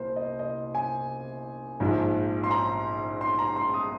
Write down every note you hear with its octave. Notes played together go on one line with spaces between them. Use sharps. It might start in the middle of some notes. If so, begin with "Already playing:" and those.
Already playing: C2 A#2 A#4 C5
D#5
D#5
G#5
A#1 G#2 F3
C6
A#5
C6
A#5
C6
D#6